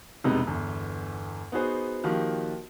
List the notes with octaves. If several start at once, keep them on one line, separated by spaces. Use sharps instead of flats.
E1 C3 G3 G#3 B3 D#4
G1 E2
B3 D#4 F#4 G#4 C5
D#3 F3 A#3 F#4 G4